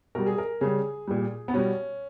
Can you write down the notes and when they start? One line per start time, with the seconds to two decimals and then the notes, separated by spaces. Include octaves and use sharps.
0.15 B2 G3 A#4
0.26 G#4
0.38 A#4
0.61 C#3 G3 G#4
1.07 A#2 G3
1.48 B3
1.54 B2 G3 C#4